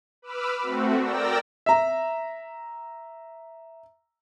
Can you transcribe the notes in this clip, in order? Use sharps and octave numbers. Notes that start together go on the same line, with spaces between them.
B4 B5 D6 E6 F6
A3 C4 F#4
A#4 D5 G5 E6 A#6
E5 A#5